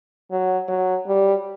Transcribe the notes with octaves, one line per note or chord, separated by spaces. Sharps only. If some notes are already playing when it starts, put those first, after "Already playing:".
F#3
F#3
G3